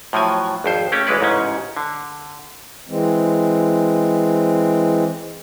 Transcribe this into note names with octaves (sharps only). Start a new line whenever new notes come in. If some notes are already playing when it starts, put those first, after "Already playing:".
A2 F3 F#3 G#5
G#1 F2 C5
A3 A#3 C#4 G4
B1 E3 G#3 B4 D5
A1 G#2 C#3 C#4
D3
E3 G#3 C4